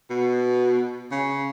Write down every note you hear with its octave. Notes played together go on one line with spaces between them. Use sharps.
B2
C#3